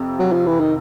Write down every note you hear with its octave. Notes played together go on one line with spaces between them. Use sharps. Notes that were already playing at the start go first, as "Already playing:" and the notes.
Already playing: F2 C3
F#3
F3
E3
D#3